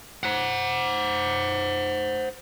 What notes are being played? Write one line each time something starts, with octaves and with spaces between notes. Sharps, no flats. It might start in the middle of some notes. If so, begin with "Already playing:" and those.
C5 F#5